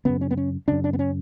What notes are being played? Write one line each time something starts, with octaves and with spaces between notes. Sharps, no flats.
F#2 C#3 B3
C#4
B3
C#4
F#2 C#3 D4
D4
B3
C#4